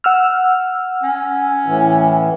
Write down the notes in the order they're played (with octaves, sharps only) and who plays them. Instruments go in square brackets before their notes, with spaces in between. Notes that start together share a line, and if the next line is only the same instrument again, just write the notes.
[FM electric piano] F#5 E6 F6
[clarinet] C#4
[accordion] A2 E3